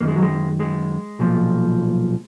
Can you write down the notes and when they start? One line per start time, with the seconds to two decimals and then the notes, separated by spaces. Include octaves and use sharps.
0.01 F#2 D#3 A#3
0.08 G#3
0.16 F#3
0.22 G#3
0.60 G#3
1.19 B1 A#2 F3